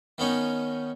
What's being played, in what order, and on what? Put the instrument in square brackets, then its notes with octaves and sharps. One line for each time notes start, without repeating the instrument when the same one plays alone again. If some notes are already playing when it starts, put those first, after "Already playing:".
[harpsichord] D#3 B3 C#4 D#4